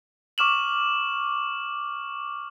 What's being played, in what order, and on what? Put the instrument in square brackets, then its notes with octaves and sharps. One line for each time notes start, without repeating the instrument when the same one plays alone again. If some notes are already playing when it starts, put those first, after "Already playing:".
[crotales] C#6 D6 F6 E7 F#7